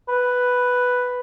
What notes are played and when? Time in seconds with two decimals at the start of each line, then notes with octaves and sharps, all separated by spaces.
0.08 B4